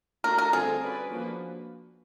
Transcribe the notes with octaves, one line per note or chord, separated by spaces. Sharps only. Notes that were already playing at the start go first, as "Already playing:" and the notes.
A3 D4 F#4 A4 A#4
A#4
D3 G3 C4 F4 G#4 A4
C#4 F#4 B4 D5
F3 A#3 D4 F#4 B4